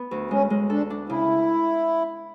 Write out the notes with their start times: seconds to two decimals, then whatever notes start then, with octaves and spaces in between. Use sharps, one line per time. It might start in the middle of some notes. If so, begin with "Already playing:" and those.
Already playing: B3
0.11 D2
0.31 G#3 C#4
0.50 G#3
0.70 D4 A4
0.90 D4
1.09 C#3 E4